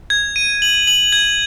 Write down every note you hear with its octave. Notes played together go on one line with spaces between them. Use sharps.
G#6
D#7
F#7
F#7
G#6